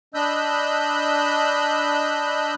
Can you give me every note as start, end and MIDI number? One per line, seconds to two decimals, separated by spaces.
0.14 2.55 62
0.14 2.55 75
0.14 2.55 83
0.14 2.55 88
0.14 2.55 90
0.14 2.55 91